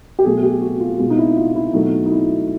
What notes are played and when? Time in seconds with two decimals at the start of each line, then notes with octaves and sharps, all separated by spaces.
0.19 G4
0.24 B2 F#3 A3 G#4
0.43 G4
0.62 F#4
0.80 F4
0.99 B2 G#3 F4
1.10 D#4
1.18 E4
1.37 F4
1.55 E4
1.73 B2 F#3 A3 D#4
2.06 D#4
2.11 E4